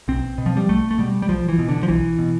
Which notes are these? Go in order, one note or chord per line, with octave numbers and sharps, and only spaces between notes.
B1 C4
B2
F3
G3
B1 A3
A3
B2 G3
G3
B1 F3
E3
B2
D3
F3
B1 E3
B2